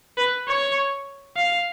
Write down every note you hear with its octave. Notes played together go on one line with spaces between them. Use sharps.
B4
C#5
F5